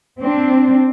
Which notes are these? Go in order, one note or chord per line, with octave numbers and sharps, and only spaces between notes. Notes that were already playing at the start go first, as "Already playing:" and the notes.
C4 D4